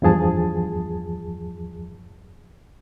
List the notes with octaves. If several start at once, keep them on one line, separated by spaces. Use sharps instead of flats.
E2 G2 F3 G#4 A5